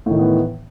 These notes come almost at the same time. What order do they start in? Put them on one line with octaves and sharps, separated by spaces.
A2 D#3 E3 B3